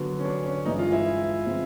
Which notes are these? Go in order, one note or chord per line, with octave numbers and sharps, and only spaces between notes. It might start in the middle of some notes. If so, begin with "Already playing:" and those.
Already playing: D3 F#3 B3
C#4
D4
C#4
G2 E3 G#3 D#4
F4
E4
D3 F3 G#3 C4